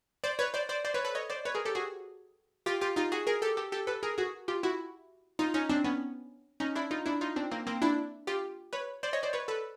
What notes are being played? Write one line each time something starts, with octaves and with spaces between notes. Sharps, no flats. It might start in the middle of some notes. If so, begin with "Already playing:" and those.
C5 D5
B4 C#5
C5 D5
C5 D5
C5 D5
B4 C#5
A4 B4
C#5 D#5
C5 D5
B4 C#5
G#4 A#4
G4 A4
F#4 G#4
F4 G4
F4 G4
D#4 F4
F#4 G#4
G#4 A#4
G4 A4
G4 A4
G4 A4
A4 B4
G#4 A#4
F#4 G#4
F4 G4
E4 F#4
D#4 F4
C#4 D#4
C4 D4
B3 C#4
C#4 D#4
D4 E4
D#4 F4
D4 E4
D#4 F4
C4 D4
A#3 C4
A#3 C4
D4 E4
F4 G4
B4 C#5
C5 D5
C#5 D#5
C5 D5
B4 C#5
A4 B4